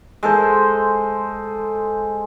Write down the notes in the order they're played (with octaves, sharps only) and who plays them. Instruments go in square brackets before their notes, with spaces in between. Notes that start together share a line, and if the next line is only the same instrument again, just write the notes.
[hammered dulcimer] G#3 A4 C5